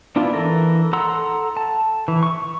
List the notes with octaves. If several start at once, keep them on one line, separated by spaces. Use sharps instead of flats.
B3 D4 E4 F4
E3 A4 A#4
A4 F#5 A#5 C6 E6
A5
E3
C#6